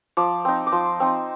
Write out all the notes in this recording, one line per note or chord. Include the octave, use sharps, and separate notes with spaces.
F3 D6
C4 D#4
D6
F3 C6
C4 D#4